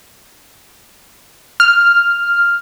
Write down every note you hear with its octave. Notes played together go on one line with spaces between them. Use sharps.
F6